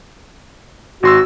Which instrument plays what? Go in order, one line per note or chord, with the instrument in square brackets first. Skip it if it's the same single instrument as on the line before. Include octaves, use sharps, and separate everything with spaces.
[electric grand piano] G#1 C6 E6 [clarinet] F#4